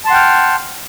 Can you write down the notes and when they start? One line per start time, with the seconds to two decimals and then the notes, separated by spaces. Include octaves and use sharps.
0.05 A5
0.08 C6
0.10 F#5
0.13 G5
0.15 F6